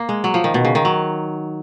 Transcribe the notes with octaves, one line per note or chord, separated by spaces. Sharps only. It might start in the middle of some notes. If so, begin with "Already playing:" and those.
Already playing: A#3
G#3
F#3
F3
D#3
B2
C#3
D#3
F#3